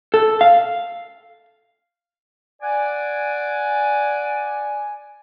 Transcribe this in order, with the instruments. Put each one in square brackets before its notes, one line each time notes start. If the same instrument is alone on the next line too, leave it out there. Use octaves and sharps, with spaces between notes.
[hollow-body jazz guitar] A4
F5
[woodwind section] D5 F#5 G#5